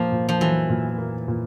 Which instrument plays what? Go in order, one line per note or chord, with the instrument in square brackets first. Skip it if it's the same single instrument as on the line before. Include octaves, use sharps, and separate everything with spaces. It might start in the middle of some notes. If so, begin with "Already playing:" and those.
Already playing: [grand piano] A#2 A#3 [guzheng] F3
[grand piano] A#2
[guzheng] F3
[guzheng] E3 [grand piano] F#3
[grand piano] A#2
A#3
A#2